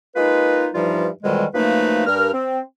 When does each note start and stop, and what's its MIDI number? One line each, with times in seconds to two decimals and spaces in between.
0.16 0.69 56
0.16 0.69 58
0.16 0.69 63
0.16 0.69 65
0.16 0.69 71
0.74 1.09 43
0.74 1.09 52
0.74 1.09 53
0.74 1.09 55
0.74 1.09 63
0.74 1.09 65
1.23 1.46 41
1.23 1.46 47
1.23 1.46 51
1.23 1.46 52
1.23 1.46 55
1.23 1.46 56
1.54 2.06 42
1.54 2.06 53
1.54 2.06 57
1.54 2.06 58
1.54 2.06 63
1.54 2.06 71
2.07 2.32 43
2.07 2.32 70
2.07 2.32 89
2.33 2.59 60